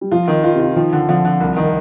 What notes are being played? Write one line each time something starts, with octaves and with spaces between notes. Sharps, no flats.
G3
F3 F4
D#3
F4
C3
F4
D#3 F3
D3
D3 F3
D3
C2
D#3